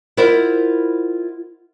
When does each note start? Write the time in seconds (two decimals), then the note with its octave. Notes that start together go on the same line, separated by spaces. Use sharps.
0.17 E4 F4 A#4 C5 D#5 F#5